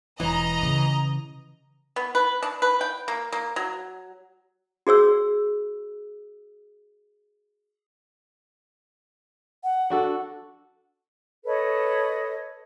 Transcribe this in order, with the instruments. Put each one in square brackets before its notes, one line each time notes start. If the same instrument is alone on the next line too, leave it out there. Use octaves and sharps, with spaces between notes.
[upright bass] E1 [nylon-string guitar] E3 [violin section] D#5 A#5
[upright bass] C#3
[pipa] B3
B4
D4
B4
G5
A#3
A#3
F#3
[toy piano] F#4 G#4 C#5 E6
[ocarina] F#5
[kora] D4 F#4 A4
[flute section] A4 B4 C#5 D#5